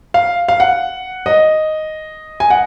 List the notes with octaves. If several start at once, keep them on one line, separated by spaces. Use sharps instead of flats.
F5
F5
F#5
D#5
G#5
F#5